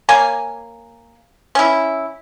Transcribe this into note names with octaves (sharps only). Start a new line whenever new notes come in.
A#3 C#5 G#5
C#4 E4